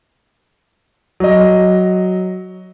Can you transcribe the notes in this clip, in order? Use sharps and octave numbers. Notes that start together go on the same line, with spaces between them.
F#3 D#5